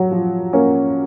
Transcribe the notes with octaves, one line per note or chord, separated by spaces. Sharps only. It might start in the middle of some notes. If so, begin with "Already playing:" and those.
Already playing: F#3
F3
A#3 C#4